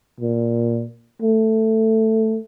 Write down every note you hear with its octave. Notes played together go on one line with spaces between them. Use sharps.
A#2
A3